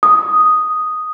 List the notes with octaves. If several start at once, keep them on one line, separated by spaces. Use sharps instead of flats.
D#6